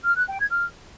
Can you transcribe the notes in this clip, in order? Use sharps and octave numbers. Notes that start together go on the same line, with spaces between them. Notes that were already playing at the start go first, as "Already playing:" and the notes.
F6
F#6
G5
G#6
F6